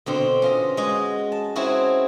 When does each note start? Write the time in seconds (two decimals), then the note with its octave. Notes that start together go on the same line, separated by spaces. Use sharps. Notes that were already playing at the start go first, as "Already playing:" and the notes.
0.06 B2 D3 C4
0.42 C#4 F4 D#5
0.77 G#3 F#4 D#5
1.32 A5
1.56 C4 C#4 E4 F#4 G#4